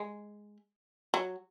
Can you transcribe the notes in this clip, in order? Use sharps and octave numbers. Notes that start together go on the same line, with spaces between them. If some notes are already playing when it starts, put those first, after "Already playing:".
Already playing: G#3
F#3